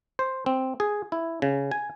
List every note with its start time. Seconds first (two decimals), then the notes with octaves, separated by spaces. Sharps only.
0.19 C5
0.46 C4
0.80 G#4
1.12 E4
1.42 C#3
1.71 G#5